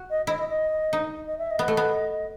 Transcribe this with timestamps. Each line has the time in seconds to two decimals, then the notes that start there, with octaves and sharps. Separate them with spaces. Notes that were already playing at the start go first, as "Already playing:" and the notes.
Already playing: F#4
0.10 D#5
0.27 E4 D#5
0.38 D#5
0.49 D#5
0.93 D#4
1.26 D#5
1.38 E5
1.50 D#5
1.59 B3
1.68 A3
1.77 B3